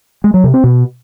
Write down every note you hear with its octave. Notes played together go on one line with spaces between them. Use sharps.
G#3
F#3
C3
C4
B2